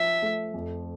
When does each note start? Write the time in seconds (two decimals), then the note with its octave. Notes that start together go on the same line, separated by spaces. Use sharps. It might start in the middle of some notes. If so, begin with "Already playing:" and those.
Already playing: F3 E5
0.22 A3
0.54 F2